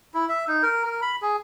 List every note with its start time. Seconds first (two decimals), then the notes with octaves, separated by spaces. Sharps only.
0.14 E4
0.29 E5
0.48 D#4
0.63 A#4
0.85 A#4
1.02 B5
1.22 G#4